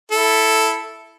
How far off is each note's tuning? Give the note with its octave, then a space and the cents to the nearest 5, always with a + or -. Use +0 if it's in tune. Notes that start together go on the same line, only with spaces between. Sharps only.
E4 +0 A4 +0